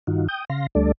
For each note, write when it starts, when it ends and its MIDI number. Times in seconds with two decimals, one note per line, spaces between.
0.07 0.27 43
0.07 0.27 51
0.07 0.27 63
0.07 0.27 65
0.07 0.27 66
0.28 0.45 79
0.28 0.45 87
0.28 0.45 91
0.50 0.66 49
0.50 0.66 77
0.50 0.66 84
0.50 0.66 94
0.75 0.92 38
0.75 0.92 55
0.75 0.92 57
0.75 0.92 62
0.75 0.92 69
0.75 0.92 74